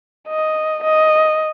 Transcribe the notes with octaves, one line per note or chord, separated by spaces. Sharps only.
D#5
D#5